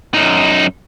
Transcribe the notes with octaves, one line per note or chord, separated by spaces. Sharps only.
F#2 D#4